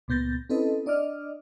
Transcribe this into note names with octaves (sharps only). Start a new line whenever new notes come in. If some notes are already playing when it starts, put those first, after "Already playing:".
C#2 A#2 B3 G6 A6 A#6
C4 C#4 E4 A4 B4 D#5
D4 D5 D#5 D6 F6